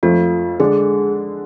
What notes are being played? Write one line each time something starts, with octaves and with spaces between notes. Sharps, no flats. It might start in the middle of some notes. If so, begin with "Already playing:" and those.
F2 F3 A3 F4
D3 G#3 D4 G#4